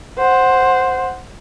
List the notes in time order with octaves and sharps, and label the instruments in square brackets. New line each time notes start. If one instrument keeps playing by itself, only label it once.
[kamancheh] C5 F#5